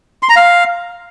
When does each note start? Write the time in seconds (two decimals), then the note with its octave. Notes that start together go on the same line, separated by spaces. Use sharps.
0.23 C6
0.29 A#5
0.36 F5